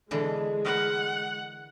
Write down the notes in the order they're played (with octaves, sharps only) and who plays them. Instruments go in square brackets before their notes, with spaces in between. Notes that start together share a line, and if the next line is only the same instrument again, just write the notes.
[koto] B2 D3 E3 [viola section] G#3
[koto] A#4 B4 [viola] F#5